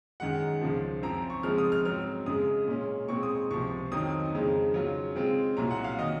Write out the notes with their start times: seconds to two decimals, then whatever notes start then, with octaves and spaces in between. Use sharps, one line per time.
0.20 F#2 D#3 G#3 F#5
0.61 C#2 C#3 F3
1.02 F#2 F3 C4 A#5
1.30 C#6
1.43 C#3 F3 G#3 C4 F6
1.58 D#6
1.72 F6
1.85 G#2 F#3 C4 F6
2.26 F#2 C#3 G#3 D#6
2.67 A#2 G#3 C#4
3.08 A#2 G#3 C4 C#6
3.23 D#6
3.51 C#2 C3 F3 C#6
3.92 F2 D#3 F#3 C4 D#4 D#6
4.33 F2 C#3 G#3 D#4
4.74 C#3 F#3 C#4 F4
5.16 C#3 G#3 C4 F4
5.57 C2 A#2 F#3 A#5
5.71 F#5
5.84 F5
5.99 D#3 F#3 D#5